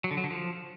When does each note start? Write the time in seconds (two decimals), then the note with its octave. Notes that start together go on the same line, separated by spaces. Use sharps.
0.04 F#3
0.11 D3
0.17 F#3
0.24 D3
0.30 F3